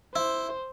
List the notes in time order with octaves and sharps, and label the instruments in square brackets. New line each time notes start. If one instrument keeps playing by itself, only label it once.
[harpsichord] E4 [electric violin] C5